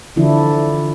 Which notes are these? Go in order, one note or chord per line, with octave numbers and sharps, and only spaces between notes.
D3 E3 F3 D4 E4